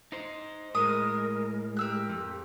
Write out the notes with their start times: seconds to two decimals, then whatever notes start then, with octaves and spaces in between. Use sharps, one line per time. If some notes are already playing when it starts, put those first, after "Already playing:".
0.12 D#4 C5
0.75 A2 G#3 A#4 D#6
1.77 G4 A#4 E6 F#6
2.09 F2